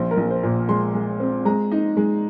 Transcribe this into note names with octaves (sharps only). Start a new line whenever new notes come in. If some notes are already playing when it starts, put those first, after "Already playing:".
Already playing: A#1 C5
A#4
A#1
C5
A#2
G#3 C6
G#3
C4
G#3 A#5
D#4
G#3